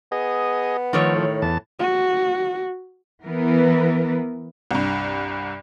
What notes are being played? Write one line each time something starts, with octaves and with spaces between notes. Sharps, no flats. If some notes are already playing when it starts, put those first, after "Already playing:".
B3 G#4 D#5
D#3 F3 A3 C#5
A2
E2 A5
F#4
E3 B3 A#4 B4
C2 G2